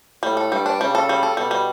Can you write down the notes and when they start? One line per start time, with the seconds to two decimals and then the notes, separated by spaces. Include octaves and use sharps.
0.23 A2 G3
0.37 A4
0.52 G2 G3
0.66 D4
0.80 C#3 G3
0.95 A4
1.09 G3
1.23 A4
1.37 B2 G3
1.51 G3